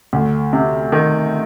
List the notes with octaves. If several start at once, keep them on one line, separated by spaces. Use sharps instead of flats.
D2
C3
D#3